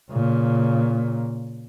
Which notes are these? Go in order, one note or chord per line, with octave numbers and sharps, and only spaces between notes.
A#2 C#3